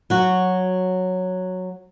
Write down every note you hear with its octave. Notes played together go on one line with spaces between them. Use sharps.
F#3 F#4